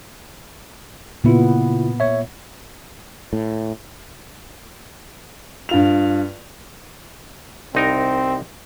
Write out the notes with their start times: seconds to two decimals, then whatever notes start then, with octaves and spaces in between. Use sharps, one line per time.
1.24 A#2 C#3 B3 E4 F4
2.00 C#5 E5
3.33 A2
5.69 G2 F4 F7
7.75 C2 C4 D#4 A#4